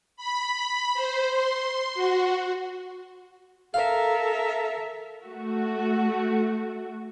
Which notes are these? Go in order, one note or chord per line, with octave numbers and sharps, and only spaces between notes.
B5
C5
C6
F#4
A4 A#4 E5 F5
A3 F#4